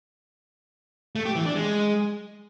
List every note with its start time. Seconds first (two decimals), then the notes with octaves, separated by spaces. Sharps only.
1.16 A3
1.26 G4
1.35 E3
1.45 D4
1.55 G#3